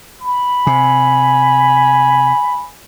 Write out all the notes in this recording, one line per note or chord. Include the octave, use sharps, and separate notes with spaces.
B5
C3 G#5